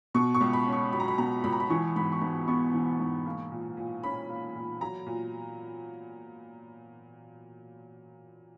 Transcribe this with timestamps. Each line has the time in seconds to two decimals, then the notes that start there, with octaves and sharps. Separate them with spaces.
0.14 B2 C#6
0.34 C#6
0.41 C#2
0.53 B5
0.67 C#4
0.72 C#6
0.93 F#3 B5
1.00 A#5
1.08 B5
1.18 B2 A#5
1.44 C#2 B5
1.52 A#5
1.60 B5
1.70 E3 C#6
1.96 G#2 B5
2.12 C#6
2.21 G#2 B5
2.48 B3 C#6
2.73 E3
3.00 G#2
3.26 A#3
3.51 A#2
3.77 A#2
4.03 C#4 B5
4.29 A#3
4.55 A#2
4.81 F#3 A#5
5.07 A#2